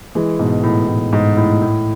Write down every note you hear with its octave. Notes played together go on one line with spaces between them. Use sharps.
E3 G#3
G#2 B2
A2
A2
G#2
A2
A2